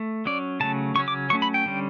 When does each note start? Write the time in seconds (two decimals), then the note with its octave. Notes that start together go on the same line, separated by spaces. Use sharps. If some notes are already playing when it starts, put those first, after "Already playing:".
Already playing: A3
0.25 F#3 C#4 D5
0.60 C#3 F#3 A3 C#4 A5
0.95 C#3 F#3 C#4 C#6
1.08 D6
1.30 F#3 C#6
1.33 A3 C#4
1.42 B5
1.54 G5
1.65 D3 G3 C#4